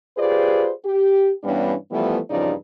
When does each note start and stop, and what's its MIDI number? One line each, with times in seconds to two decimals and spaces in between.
0.18 0.71 65
0.18 0.71 67
0.18 0.71 68
0.18 0.71 71
0.18 0.71 72
0.18 0.71 74
0.85 1.31 67
1.44 1.74 43
1.44 1.74 52
1.44 1.74 55
1.44 1.74 59
1.44 1.74 61
1.44 1.74 62
1.91 2.19 52
1.91 2.19 53
1.91 2.19 55
1.91 2.19 57
1.91 2.19 59
2.30 2.53 40
2.30 2.53 43
2.30 2.53 49
2.30 2.53 53
2.30 2.53 63
2.30 2.53 74